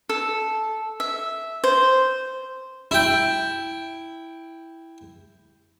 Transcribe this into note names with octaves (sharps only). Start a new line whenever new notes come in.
A4
E5
C5
E4 G5